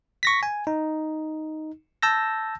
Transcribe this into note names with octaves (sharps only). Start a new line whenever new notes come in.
C#6 A#6 B6
G#5
D#4
A5 E6 G6 A#6